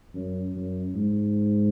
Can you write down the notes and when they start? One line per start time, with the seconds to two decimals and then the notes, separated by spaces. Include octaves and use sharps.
0.14 F#2
0.55 F#2
0.95 G#2